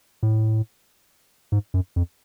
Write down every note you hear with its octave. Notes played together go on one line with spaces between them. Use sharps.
A2
G#2
F#2
F2